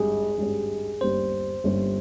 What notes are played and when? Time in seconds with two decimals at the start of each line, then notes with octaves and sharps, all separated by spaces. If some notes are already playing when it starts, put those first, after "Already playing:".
Already playing: G#1 G2 G3 G#4
0.38 G#1 G2 G3 C#4
1.01 G1 G2 G3 A#3 C#4 C5
1.64 G1 G2 G3 A#3 C#4